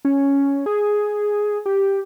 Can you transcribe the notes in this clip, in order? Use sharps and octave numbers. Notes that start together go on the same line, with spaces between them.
C#4
G#4
G4